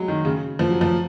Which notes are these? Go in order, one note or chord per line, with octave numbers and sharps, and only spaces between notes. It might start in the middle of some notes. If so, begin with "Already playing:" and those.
Already playing: F#3 G#3
D#3
C#3
F3
F#3
F3